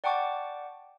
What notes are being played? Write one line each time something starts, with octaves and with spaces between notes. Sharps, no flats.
D5 F#5 G5 A5 C#6 D6